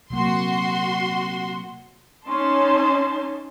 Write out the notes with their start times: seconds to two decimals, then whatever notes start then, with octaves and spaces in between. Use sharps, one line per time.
0.10 C3 F#3 A#3 F#4 C6
2.25 C#4 D#4 A5 C6